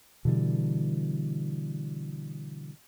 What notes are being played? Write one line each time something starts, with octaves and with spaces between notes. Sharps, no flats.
B2 D3 E3 G3